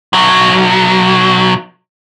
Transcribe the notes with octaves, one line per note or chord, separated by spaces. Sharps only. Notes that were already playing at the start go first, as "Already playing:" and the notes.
B1 F#3